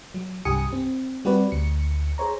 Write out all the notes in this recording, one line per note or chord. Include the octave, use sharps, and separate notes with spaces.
F#3
C2 G2 G4 G#5 D#6 C#7
C4
G3 C4 F#4 G4 B4 D5
D2 C#7
G#4 C5 C#5 A#5